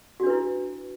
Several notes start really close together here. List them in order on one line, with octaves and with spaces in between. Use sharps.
F#4 D4 B4 E4